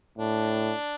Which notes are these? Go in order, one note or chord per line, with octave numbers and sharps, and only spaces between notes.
A2 D4